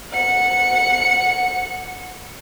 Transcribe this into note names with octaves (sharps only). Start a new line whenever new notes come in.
F#5 C#7